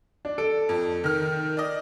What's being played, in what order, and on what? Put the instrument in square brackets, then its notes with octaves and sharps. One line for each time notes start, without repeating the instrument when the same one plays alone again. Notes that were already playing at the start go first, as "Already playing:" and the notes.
[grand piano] D4
A4 D7
[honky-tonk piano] F2
D#3 F6
D5 D#5